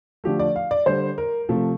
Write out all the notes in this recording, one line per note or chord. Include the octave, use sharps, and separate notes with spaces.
D3 F3 A3 G4
D5
F5
D5
D3 G3 C5
A#4
C3 F3 A3